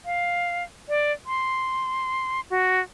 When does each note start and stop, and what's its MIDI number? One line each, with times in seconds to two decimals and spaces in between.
0.06 0.64 77
0.89 1.12 74
1.26 2.41 84
2.50 2.80 66